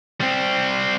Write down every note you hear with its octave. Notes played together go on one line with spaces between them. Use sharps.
G3 C4